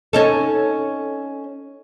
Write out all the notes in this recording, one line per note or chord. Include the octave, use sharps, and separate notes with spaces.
C#4 D#4 A4